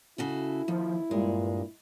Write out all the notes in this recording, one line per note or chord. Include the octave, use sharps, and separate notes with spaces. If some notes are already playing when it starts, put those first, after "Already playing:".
C#3 E4 F#4 A4
D#2 F3
G2 A#2 G#3